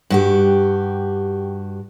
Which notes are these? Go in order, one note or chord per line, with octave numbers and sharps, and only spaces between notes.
G2 F#4 G4